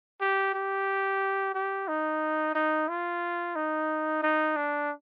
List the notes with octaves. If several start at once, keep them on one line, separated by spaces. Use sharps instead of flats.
G4
G4
G4
D#4
D#4
F4
D#4
D#4
D4